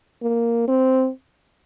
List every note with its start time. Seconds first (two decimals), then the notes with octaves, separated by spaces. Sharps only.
0.22 A#3
0.68 C4